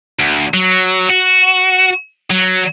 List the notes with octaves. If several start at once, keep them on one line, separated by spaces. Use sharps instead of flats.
D2
F#3
F#4
F#3